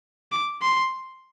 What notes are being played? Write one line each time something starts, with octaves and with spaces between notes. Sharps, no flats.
D6
C6